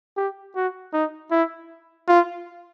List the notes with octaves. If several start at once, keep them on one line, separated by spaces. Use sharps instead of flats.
G4
F#4
D#4
E4
F4